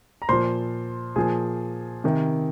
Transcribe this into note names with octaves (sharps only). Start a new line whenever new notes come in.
A#5
A#2 F3 C5 C6
A#2 F3 G#4 G#5
C3 D#3